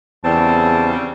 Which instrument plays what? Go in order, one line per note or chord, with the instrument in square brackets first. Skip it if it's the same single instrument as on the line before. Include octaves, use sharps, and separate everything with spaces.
[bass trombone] E2 [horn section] C#3 G3 C4 [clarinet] A5